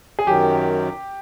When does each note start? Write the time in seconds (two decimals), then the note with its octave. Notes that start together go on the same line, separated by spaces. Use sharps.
0.19 G#4
0.27 F#2 D#3 F#3 G4